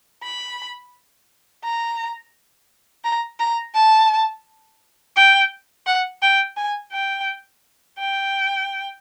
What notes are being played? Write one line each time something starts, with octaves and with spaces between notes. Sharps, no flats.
B5
A#5
A#5
A#5
A5
G5
F#5
G5
G#5
G5
G5